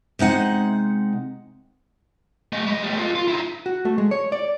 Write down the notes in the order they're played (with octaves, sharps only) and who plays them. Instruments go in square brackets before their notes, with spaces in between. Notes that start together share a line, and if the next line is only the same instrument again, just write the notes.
[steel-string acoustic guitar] C3 G#3 D#4 F#5
[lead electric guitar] A3 D#5
G3 D#5
G3 A3
F4 A4
F4
D#4 E4
[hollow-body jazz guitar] F#4
A3
G#3
C#5
D5